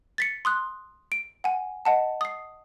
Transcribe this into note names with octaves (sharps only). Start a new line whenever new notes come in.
A6 B6 C#7
C6 D#6 F#6
D7
F#5 G#5
D#5 F#5 A5
D#6 C7